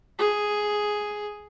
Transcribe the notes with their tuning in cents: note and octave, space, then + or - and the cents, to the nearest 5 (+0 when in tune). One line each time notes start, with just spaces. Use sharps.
G#4 +5